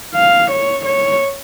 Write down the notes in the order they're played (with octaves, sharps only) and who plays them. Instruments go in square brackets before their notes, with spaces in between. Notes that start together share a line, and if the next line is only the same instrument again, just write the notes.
[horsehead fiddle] F5
C#5
C#5